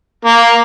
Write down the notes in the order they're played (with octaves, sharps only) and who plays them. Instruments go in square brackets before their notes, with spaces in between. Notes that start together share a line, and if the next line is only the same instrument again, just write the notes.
[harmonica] A#3